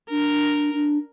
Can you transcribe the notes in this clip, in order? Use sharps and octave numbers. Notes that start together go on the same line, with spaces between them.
D4 A#4
D4